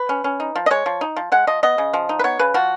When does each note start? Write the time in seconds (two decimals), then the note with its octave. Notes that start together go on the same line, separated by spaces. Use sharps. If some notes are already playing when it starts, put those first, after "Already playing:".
Already playing: B4
0.09 C#4
0.24 C#4
0.40 D#4
0.56 F3
0.66 D#5
0.70 G#3 C#5
0.86 F3
1.01 D#4
1.16 F3
1.32 G#3 F#5
1.47 F3 D#5
1.63 B3 D#5
1.78 C#3
1.93 F3
2.09 D#4
2.19 B4
2.24 B3 C#5
2.39 C#3 B4
2.54 F3 F#4